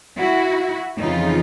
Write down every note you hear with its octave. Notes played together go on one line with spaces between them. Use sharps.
E4 F#4
F2 C#3 E3 D#4 F4